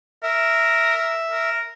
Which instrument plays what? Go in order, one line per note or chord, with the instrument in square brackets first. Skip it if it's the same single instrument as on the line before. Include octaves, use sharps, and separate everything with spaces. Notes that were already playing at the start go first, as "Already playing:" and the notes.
[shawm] A#4 [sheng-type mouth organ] E5
[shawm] A#4